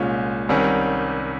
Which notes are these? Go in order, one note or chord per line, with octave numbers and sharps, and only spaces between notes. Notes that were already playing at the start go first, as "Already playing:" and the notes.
Already playing: C2 A#2 G#3 C#4
C2 C3 D#3 G3 C#4